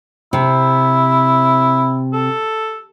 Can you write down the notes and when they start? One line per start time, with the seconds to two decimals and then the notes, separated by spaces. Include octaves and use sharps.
0.33 C3 E4
2.13 A4